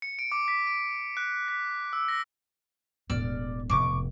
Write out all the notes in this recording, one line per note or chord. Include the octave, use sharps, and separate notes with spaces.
C#7
D7
D6
B6
D7
F#6
B6
E6
A#6
E1 A2 D5 E6 F6
F1 F2 C#6 D6